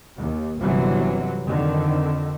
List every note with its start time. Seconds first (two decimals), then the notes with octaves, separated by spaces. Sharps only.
0.17 D#2
0.59 G1 C3 E3 F#3 C4
1.45 F2 D3 D#3